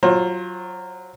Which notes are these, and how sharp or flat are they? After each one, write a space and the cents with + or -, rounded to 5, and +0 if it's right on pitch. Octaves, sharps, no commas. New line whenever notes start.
F#3 +0 F4 +5 C5 +30